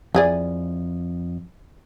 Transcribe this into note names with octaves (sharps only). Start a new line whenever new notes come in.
F2 E3 G#4 D5